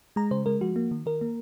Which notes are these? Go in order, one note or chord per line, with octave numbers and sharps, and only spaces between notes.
G#3 A#5
C#3 C5
G#3 A#4
F3 F#4
A#3
D#3
D#3 A#4
A#3